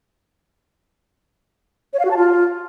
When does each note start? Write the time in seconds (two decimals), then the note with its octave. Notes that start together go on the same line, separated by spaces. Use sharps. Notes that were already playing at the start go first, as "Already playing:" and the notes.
1.93 C#5
1.99 F5
2.05 F#4
2.11 A5
2.17 F4